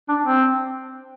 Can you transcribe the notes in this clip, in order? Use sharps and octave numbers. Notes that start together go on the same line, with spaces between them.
D4
C4